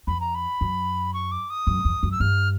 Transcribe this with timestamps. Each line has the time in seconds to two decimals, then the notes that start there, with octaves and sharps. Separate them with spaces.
0.07 F2 B5
0.21 A#5
0.35 B5
0.61 F#2
1.14 C#6
1.32 D6
1.50 D#6
1.67 F#2
1.85 F2
2.03 F#2
2.12 E6
2.20 G2 F6